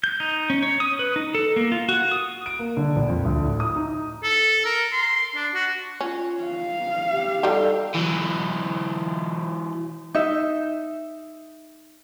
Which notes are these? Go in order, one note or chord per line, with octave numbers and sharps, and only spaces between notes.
G6
D#4
C#4
C#5
D#6
B4
D#4
A4
A#3
F4
F#4
D#6
D7
A#3
D3
A#1
F2
D2
A2
D#6
D#4
A4
A#4
C6
D4
F#4
C#4 F4
F5
G4
G3 D#4 G4 A4
E3 F#3
D#4 E5